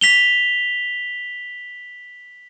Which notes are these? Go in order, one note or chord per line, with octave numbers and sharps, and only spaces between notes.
B6 F7 G7